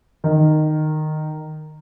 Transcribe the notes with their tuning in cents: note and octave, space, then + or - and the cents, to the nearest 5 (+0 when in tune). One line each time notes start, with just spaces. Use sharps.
D#3 -15